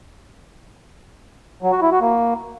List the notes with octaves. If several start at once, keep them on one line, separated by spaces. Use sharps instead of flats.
F#3
F#4
E4
F#4
A#3